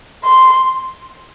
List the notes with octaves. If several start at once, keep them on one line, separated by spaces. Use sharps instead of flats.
C6